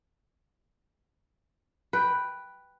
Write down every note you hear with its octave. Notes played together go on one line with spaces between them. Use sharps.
B4 G5